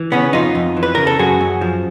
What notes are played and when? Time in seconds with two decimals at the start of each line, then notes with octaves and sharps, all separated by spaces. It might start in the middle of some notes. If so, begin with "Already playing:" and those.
Already playing: E3
0.12 C#3 B3 C#4
0.33 F2 D#4 F4
0.55 F2
0.77 E3
0.83 B4
0.95 C#3 A#4
1.07 A4
1.19 F#2 F#4 G#4
1.41 F#2
1.61 F3